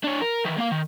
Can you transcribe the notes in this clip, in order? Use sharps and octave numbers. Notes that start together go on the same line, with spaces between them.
D4 C#5
A#4
D#3 E3
A#3 F5
D#3